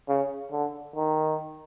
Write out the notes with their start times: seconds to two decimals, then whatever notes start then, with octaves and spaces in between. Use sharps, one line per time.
0.08 C#3
0.51 D3
0.96 D#3